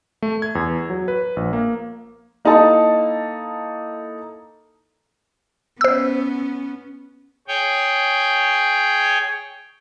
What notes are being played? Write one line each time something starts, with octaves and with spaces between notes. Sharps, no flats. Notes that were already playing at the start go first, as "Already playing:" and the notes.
A3
G#6
E2
F#3
B4
A#1
A#3
A#3 D#4 E4 A4 A5
B3 C#4 C5 E6
G#4 C#5 G5